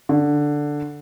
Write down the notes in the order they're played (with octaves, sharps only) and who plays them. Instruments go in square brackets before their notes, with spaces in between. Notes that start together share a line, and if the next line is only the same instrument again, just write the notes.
[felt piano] D3